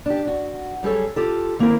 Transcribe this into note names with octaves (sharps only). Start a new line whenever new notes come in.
D4 G4
F#4
F#2 G3 G#4 A4 C#5
F4 G4 A4
D#3 A#3 C4 E4 A#4